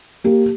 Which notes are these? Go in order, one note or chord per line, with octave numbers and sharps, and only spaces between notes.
A#3 G4